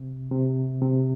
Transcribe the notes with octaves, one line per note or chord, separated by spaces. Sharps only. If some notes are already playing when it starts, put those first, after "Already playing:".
Already playing: C3
C3
C3